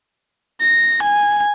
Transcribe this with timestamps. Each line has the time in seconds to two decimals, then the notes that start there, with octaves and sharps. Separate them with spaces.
0.61 A#6
1.02 G#5